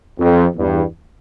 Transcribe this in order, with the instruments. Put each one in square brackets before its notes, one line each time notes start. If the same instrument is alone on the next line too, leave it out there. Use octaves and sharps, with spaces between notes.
[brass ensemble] F2
E2 G2